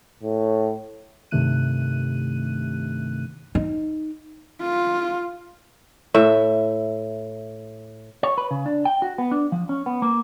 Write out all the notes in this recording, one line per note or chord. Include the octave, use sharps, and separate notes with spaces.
A2
G2 C3 D#3 A3 F#6 D#7
D#4
F4
A2 E5
C#5
B4
C#3
D4
G5
F#4
B3
D4
F3
C#4
B3
A#3